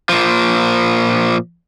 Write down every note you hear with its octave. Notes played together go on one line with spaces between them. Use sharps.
A#2 F3